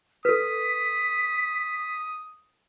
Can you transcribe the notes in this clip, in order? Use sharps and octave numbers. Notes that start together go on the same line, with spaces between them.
A4 B4 D#6 B6